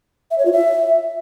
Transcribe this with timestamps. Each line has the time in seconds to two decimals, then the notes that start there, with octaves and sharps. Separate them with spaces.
0.31 E5
0.38 C#5
0.45 F4
0.53 E5